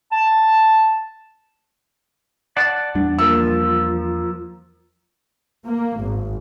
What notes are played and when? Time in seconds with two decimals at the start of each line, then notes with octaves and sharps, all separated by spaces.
0.12 A5
2.57 D5 F#5 A5
2.95 E2 G3 D4
3.19 F3 A#3 E6
5.65 A#3
5.99 G#1